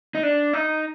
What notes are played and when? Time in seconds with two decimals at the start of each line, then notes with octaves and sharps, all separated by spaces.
0.15 D#4
0.23 D4
0.53 D#4